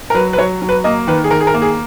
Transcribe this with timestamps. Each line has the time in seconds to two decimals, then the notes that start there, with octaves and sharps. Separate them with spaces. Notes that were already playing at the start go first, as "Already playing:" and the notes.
0.10 A#4
0.14 F#3 B4
0.33 B4
0.38 F#3 C#5
0.62 F#3
0.69 B4
0.84 A#3 D#5
1.07 D#3 B4
1.24 G#4
1.31 D#3 A#4
1.41 G#4
1.47 A#4
1.54 A#3
1.62 G#4